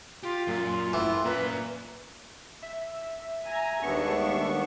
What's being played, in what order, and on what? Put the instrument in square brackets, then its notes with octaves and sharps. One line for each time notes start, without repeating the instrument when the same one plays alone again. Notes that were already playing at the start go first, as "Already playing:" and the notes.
[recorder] F4 [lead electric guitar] G4
[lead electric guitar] F#2 [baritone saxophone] A#2
[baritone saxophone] A2 [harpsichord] E3
[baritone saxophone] A#2 [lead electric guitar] C#4 A#4 [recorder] B4
[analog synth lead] E5
[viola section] G#5 A#5
[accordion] D#2 B3 C#6 [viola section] G3 G#3 D4